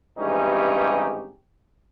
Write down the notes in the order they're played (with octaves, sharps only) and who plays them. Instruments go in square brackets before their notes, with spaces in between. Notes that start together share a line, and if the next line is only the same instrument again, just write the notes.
[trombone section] G#1 G2 E3 C#4 D#4 G4